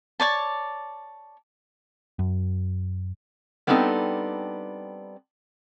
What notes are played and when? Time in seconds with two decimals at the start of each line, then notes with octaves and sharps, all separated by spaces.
0.20 C#5 D5 A5
2.19 F#2
3.67 G3 B3 C4 D4 D#4 A4